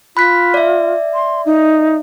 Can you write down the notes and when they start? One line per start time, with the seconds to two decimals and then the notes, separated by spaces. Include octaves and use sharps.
0.17 F4 B5 F#6 B6
0.54 D5 E5
1.14 C6
1.46 D#4